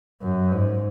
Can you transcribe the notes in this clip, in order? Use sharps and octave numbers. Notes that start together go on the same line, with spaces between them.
F#2
G#2